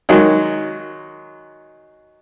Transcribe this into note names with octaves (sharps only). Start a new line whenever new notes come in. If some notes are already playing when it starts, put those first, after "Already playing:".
D#3 F#3 G#3